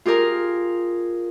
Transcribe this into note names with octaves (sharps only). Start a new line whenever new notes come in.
F4 G4 G#4 A#4